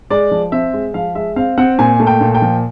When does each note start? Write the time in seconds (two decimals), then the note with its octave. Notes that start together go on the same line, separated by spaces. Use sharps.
0.10 G#3 D5
0.31 F3
0.52 C4 E5
0.74 G#3
0.94 F3 F5
1.15 G#3 E5
1.36 C4 F5
1.58 C4 F#5
1.79 A#2 G#5
2.00 A3
2.07 G5
2.21 A#2
2.35 G5
2.42 F3